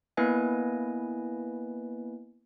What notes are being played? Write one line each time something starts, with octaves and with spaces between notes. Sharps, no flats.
A#3 B3 E4 B4 D#5 G#5